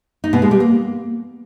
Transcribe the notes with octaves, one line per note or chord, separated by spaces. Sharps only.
D#4
B2
G#3
G3
A#3